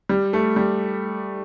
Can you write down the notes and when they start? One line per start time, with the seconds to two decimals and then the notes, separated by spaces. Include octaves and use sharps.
0.09 G3
0.33 A3
0.56 G3